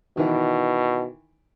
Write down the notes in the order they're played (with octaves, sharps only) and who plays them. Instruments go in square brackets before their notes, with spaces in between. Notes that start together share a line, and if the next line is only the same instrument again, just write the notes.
[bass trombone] B2 [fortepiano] D#3 E3